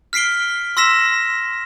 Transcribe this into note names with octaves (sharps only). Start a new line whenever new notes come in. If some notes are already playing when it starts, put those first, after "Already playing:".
F6 B6 C7 D7 G7
C6 E6 A#6 B6 E7